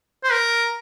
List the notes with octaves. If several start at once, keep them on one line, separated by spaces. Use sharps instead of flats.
C5
A#4